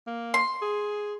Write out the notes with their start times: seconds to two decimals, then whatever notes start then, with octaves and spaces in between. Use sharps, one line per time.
0.07 A#3
0.34 C6
0.62 G#4